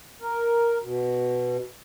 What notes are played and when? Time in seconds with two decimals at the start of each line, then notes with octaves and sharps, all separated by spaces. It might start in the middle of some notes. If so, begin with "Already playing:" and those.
0.22 A#4
0.83 B2